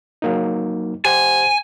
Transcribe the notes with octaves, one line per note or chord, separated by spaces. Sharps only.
F#3 A#3 D#4
G4 C5 F#5 G#5